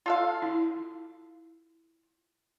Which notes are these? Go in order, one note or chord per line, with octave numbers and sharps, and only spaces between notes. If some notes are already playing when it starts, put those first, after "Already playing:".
F4 A4 F5
E4